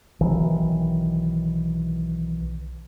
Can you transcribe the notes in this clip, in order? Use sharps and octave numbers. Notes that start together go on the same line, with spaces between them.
B1 D#3 E3